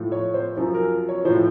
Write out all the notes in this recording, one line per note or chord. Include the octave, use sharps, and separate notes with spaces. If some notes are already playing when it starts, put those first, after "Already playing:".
Already playing: A2 F3
C#5
C5
F#2 F3
A#4
C#5
A2 F3 C5